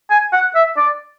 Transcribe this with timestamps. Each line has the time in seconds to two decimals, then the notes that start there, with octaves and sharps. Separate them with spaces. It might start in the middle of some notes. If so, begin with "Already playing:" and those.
0.11 G#5
0.33 F#5
0.55 E5
0.77 D5